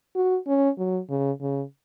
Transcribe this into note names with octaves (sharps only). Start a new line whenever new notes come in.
F#4
C#4
F#3
C#3
C#3